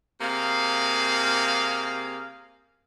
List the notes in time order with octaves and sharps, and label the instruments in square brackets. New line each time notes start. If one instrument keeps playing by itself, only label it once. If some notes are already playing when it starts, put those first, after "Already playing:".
[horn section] C3 A#3 G#4 F5